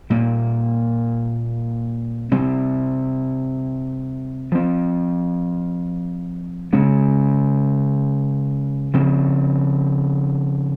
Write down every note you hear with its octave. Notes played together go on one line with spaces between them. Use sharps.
A#2 G3 A#3
C3 G3 C4
F3 C4
C#3 G#3 C#4
C#3 F3 C4